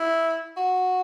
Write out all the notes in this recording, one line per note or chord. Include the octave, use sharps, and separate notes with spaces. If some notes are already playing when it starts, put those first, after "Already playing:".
Already playing: E4
F#4